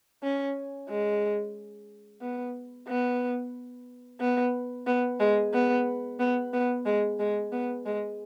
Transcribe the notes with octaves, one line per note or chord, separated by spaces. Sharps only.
C#4
G#3
B3
B3
B3
B3
G#3
B3
B3
B3
G#3
G#3
B3
G#3